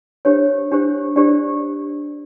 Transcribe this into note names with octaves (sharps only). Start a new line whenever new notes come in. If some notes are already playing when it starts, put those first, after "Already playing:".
D4 G4 C5 C#5
D4 G4 C5
D4 G4 C5 D5